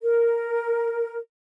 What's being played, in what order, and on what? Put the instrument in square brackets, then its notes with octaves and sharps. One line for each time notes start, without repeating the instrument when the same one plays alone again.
[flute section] A#4